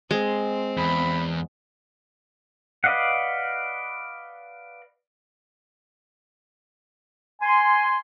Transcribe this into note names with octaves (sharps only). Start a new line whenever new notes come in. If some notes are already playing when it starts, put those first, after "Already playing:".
G#3 C4
E2 B5
B4 D5 D#5 F5 F#5
G#5 C6